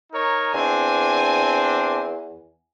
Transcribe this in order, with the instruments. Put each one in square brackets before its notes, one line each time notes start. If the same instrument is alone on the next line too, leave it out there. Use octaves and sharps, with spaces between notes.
[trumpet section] D#4 A#4 C#5
[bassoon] E2 [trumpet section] C4 D4 [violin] G#5